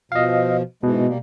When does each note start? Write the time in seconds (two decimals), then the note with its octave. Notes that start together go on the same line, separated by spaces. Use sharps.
0.12 B2 F3 D#5 F5
0.83 G#2 B2 E3 G#3
1.07 G3 A#3